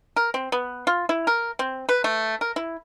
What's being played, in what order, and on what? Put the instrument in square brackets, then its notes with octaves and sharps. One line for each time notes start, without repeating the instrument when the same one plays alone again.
[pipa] A#4
C4
B3
F4
E4
A#4
C4
B4
A3
A#4
E4